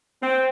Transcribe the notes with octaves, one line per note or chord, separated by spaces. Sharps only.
C4